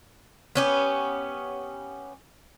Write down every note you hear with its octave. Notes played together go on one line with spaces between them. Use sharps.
B3 C#4 G4